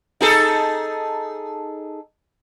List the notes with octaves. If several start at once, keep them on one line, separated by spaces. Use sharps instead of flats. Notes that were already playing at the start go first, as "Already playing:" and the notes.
D#4 G#4 A4